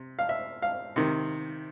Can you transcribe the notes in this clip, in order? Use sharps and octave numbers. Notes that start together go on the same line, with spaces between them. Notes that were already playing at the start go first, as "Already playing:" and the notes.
Already playing: C3
F5
E5
F5
C3 D#3